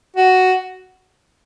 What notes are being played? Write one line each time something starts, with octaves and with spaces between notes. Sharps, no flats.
F#4